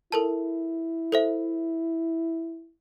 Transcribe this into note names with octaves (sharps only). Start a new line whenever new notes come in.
E4 A4 A#4 A5
A4 C5 E5